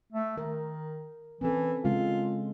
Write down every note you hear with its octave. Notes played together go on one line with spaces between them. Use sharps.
A3
D#3 A#4
E3 C4 C#4 A4
C#3 G#3 C#4 F4